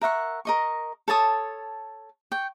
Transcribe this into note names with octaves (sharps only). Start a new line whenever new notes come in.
A#4 E5 F#5 C#6
A#4 D#5 C#6
A4 C#5 A5 D#6
G5 C#6